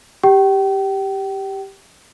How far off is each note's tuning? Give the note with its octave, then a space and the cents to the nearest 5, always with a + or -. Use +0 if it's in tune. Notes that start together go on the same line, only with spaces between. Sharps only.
G4 +0 G5 -35